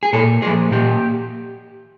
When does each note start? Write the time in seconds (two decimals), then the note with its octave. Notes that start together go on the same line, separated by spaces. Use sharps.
0.03 G#4
0.13 A#2 A4
0.42 F3 A#3 G#4
0.71 A#2 G4